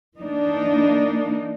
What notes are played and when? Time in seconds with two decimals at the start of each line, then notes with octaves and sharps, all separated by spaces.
0.18 E3 A#3 D4 D#4